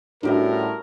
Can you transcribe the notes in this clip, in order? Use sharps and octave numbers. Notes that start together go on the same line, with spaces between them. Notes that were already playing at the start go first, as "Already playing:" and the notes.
A2 G3 C#4 D4 F#4 G4 A#4 D#5